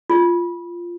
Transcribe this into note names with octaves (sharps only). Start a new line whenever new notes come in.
F4